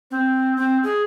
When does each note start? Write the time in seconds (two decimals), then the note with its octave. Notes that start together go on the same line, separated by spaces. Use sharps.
0.11 C4
0.57 C4
0.84 G#4